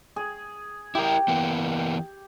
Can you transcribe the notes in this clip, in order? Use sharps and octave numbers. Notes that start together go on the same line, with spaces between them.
G#4
E4 G4 A#4
E3 A#3 B3